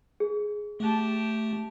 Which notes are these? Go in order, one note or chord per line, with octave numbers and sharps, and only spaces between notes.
G#4
A3 G4 A5